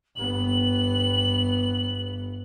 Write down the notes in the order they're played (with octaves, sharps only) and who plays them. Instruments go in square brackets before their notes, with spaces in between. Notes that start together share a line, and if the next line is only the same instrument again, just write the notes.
[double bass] G1 B3 [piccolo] F#7